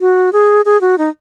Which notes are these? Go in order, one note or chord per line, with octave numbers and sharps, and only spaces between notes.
F#4
G#4
G#4
F#4
D#4